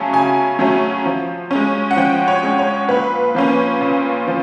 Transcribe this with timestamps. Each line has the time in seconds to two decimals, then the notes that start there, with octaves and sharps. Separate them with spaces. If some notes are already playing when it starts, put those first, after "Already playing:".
Already playing: C#3 F#3 A3 C#4 G#5 A5
0.13 C#3 G#5
0.59 F#3 A3 C#4
1.06 F3
1.51 G#3 C#4
1.91 F#5
1.97 F3 G5
2.28 C#5
2.43 G#3 C#4
2.59 C#5
2.89 A#2 B4
3.35 F3 A#3 C#4
3.81 A#2
4.27 F3